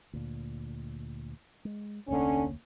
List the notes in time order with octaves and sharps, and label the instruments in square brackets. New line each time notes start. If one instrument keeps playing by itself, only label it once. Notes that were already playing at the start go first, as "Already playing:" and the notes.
[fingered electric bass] D2 A#2
G#3
[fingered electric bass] F1 D2 A#3 [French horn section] D3 C#4